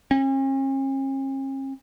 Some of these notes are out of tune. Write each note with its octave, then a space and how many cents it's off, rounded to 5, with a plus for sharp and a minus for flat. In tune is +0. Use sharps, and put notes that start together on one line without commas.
C#4 -45